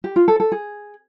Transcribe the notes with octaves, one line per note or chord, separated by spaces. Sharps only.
G4
F4
A4
A4
G#4